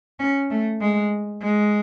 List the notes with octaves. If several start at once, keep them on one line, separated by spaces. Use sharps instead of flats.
C#4
A3
G#3
G#3